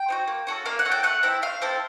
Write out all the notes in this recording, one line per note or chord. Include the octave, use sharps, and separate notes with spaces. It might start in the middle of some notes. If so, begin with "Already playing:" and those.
Already playing: G5
C4 D#4 F#4
A#3
C#4 F#4 A4
A#3 F5
F#5
C#4 F#4 A4
G5
A3 F#5
C4 E4 A4 E5
A3 F5
C4 E4 A4